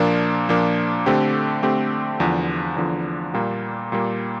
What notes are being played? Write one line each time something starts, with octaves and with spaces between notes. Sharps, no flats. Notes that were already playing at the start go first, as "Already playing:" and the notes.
Already playing: A#2 F3 A#3 D4
A#2 F3 A#3 D4
D3 A3 C4 G4
D3 A3 C4 G4
E2 D3 F3
E2 D3 F3
A#2 G3 A#3
A#2 G3 A#3